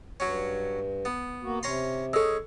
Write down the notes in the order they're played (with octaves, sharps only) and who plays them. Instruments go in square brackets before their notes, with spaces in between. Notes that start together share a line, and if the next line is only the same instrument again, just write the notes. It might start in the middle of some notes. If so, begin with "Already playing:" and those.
[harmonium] G2 [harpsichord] F#3 C#4
[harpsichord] B3
[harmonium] A#3 F#4
[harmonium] C3 [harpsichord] C#4 A#5 C6
[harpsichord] G#3 C#4 [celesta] A4 E6